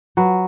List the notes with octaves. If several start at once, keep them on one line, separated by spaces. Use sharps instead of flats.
F#3 B4